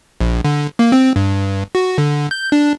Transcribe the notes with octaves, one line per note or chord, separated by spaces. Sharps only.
A#1
D3
A#3
C4
G2
F#4
D3
G6
D4